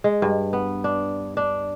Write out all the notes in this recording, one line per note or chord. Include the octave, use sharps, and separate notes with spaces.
G#3
G2
B3
D4
D4